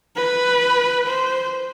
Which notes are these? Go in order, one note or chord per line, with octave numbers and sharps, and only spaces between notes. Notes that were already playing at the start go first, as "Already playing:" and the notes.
B4
C5